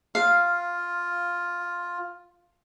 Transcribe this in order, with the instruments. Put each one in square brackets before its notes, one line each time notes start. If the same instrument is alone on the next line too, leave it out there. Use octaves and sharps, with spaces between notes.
[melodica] F4 [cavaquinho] F5